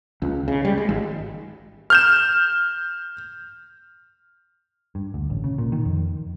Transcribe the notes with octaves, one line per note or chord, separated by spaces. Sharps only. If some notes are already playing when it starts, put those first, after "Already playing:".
C#2
C#3
G3
G#3
G#1
F6 G6 E7
G2
D2
A1
C#3
A#2
D#3
F2